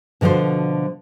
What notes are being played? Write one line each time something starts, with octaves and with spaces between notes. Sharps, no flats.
B2 D3 F3 F#4 C5